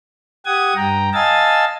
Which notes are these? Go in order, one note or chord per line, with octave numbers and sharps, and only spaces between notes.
G4 F#5 D#6 G#6
G2 G5 A#5
D#5 F5 G#5 A5 E6 A6